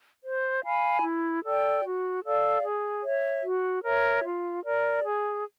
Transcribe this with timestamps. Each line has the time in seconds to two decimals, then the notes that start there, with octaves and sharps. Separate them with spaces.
0.24 C5
0.64 F5 G#5 B5
1.03 E4
1.44 A4 D5 G5
1.84 F#4
2.23 A4 D5 F5
2.64 G#4
3.04 C#5 E5
3.43 F#4
3.84 A#4 C#5 E5
4.24 F4
4.64 A#4 D5
5.04 G#4